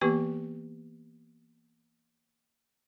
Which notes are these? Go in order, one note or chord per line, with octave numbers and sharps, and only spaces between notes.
E3 A#3 B3 G4 B4 C#6